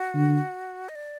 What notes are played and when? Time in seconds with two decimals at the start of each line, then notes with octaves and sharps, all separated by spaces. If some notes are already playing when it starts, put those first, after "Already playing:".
Already playing: F#4
0.15 D3
0.89 D#5
0.95 D5